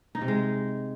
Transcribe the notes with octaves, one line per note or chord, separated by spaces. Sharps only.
D#4
C3
G#3